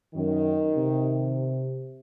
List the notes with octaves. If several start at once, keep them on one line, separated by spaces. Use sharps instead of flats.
F#2 D#3
C3